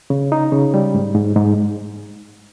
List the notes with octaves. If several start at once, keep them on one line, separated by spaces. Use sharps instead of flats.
C#3
D#4
C#3
G3
G#2
G#2
G#2